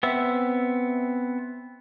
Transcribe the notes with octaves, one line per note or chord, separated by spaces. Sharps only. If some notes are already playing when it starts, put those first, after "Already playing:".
B3 C4 E5